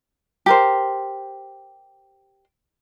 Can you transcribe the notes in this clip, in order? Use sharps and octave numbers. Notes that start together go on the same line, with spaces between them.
G4 A#4 C5